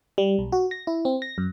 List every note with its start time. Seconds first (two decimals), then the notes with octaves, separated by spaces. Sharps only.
0.18 G3
0.39 B1
0.52 F#4
0.71 A#6
0.87 E4
1.05 C4
1.22 A#6
1.38 F#2